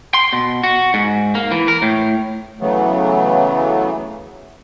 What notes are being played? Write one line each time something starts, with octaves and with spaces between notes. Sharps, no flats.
C6
B2
F#4
G#2
A#3
E3
A#4
A2
C#3 E3 F#3 A3 B3